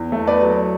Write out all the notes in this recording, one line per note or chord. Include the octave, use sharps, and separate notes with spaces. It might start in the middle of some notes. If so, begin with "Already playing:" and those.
Already playing: E2
A3
B4 D5
F#3